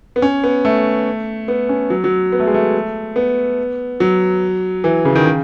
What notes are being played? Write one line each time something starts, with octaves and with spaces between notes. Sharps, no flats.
B3
C#4
B3
A3
B3
C#4
F#3
F#3
B3
A3
G#3
A3
B3
F#3
E3
C#3
D#3
C#3